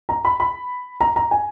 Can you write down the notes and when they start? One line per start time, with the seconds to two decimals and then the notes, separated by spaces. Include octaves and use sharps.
0.09 A#5
0.25 B5
0.40 B5
1.01 A#5
1.16 A#5
1.31 G#5